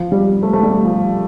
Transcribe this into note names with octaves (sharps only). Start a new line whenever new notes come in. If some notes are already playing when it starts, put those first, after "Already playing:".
Already playing: F3
G3
A3
A3
G3
F3